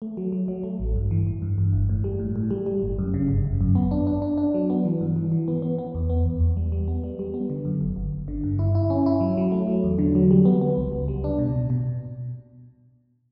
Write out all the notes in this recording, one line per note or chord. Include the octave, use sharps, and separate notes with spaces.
A3
F#3
F#3
F#3
A3
A1
G2
E3
E3
G2
G2
G1
A2
G3
A2
A2
G3
G3
G1
F#2
C#3
G1
G1
F#2
B3
D4
D4
D4
D4
F#3
B3
E3
G2
E3
E3
B3
B3
B3
E2
B3
E2
E2
G3
G3
B3
G3
G3
B3
D3
F#2
G1
G1
G1
D3
G2
E4
E4
C#4
E4
F#3
F#3
A3
F#3
E2
D3
F#3
G3
B3
B3
C#2
C#2
G3
D4
B2
B2
B2